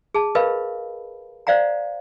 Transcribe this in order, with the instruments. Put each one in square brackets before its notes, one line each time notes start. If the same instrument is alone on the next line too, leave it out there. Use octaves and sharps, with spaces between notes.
[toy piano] G#4 A5
A#4 B4 D#5 F5 B5
C5 D5 F5 F#5 A#5